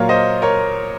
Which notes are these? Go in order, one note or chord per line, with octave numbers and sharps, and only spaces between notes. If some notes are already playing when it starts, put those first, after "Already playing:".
Already playing: A#2 F#3 A#3 C#5 F5
C5 D#5
A#4 C#5